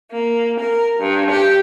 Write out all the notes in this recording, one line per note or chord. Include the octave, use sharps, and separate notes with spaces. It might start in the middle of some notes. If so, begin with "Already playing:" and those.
A#3
A#4
G2
G4